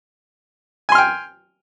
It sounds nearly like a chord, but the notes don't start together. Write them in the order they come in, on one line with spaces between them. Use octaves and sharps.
G#5 C6 F6 G5